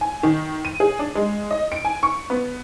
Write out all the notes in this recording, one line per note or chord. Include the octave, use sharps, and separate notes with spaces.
G#5
D#3
D#7
G#4
D4
G#3
D#5
D7
G#5
C#6
B3